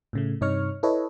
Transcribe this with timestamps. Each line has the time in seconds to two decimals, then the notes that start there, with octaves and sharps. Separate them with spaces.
0.13 A2 C#3 A3
0.41 G2 C3 D#4 C#5 C#6 F6
0.83 E4 A4 B4 C#5 D#5